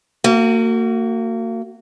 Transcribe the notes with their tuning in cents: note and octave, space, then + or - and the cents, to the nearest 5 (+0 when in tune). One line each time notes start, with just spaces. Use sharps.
A#3 -35 F#4 +0